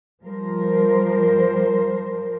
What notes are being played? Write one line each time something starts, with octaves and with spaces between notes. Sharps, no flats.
F3 G3 A#4 C5